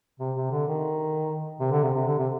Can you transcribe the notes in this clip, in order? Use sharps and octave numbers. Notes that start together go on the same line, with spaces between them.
C3
C3
D3
D#3
C3
D3
C3
C3
D3
C3